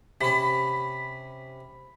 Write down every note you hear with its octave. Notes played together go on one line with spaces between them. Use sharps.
C3 C#4 B5